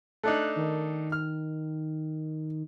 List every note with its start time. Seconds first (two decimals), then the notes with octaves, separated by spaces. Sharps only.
0.23 A3 D4 D#4 F#6
0.56 D#3
1.12 F6